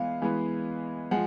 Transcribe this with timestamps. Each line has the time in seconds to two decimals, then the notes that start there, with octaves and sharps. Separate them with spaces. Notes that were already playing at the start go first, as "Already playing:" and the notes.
Already playing: E3 G#3 B3 F5
0.22 E3 G#3 B3
1.11 F3 G#3 F#5